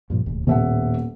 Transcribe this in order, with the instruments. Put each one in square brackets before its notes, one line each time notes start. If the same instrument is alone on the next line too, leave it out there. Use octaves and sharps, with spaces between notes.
[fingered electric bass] G2 A#2 F3
E1 D#2 A2
[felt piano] D#1 E5 F#5 [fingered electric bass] A2 A#3 B3